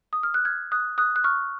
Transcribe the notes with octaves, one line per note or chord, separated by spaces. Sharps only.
D#6
F6
F#6
F6 G#6
D#6 F#6
D#6 F#6
F#6
C#6 F6